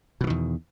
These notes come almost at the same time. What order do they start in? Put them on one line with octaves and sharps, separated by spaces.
B2 E3 D#3 E2